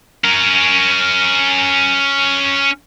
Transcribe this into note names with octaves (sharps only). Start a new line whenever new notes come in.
C#4 A#4